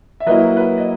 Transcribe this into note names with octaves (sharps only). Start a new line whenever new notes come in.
E5
F#3 A#3 E4 B4 D#5
B4
D#5